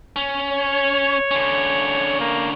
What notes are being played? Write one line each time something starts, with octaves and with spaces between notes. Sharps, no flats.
C#4
C#5
D3 C#4
A#3